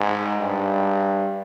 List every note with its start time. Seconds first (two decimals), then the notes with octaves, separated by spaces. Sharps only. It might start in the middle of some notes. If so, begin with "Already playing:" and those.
Already playing: G#2
0.41 G2